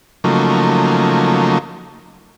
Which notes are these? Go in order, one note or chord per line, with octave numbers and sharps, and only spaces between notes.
C#3 F3 F#3 A3 A#3 D#4